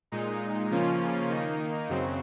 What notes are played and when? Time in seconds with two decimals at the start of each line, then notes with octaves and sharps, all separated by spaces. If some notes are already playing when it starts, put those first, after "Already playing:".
0.12 A#2 G#3 D#4
0.70 C#3 F3 A#3 C#4 F4
1.30 D#3 A#3 D#4
1.89 F#2 C#3 F#3 C4